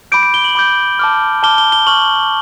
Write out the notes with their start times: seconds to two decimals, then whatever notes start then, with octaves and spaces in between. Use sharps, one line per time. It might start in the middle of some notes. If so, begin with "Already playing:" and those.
0.12 B5 D6 G6 D7
0.23 D7
0.34 G7
0.44 F#7
0.55 B5 D6 G6
0.99 A5 D6 F6
1.43 A5 D6 F6 G7
1.58 G7
1.72 G7
1.87 C#6 F6 F#7